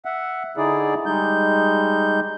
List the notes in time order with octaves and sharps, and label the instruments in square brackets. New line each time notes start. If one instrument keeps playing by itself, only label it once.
[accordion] E5 F#5
D3 D#4 E4 G#4 D5
G3 G#3 D#4 G6